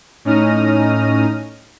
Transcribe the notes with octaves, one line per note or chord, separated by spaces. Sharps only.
A2 C#4 D#4 F6 A#6 D#7